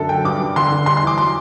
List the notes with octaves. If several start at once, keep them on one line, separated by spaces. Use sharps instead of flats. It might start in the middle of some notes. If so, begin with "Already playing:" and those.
Already playing: F#2 D3 A4
F#3 G5
G2 D6
G2
D3 C6
D3
G3 C6
C6
E3 D6
F#3 C6